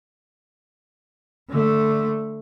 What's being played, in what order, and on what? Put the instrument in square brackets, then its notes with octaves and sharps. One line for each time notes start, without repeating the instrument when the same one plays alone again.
[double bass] D3 A3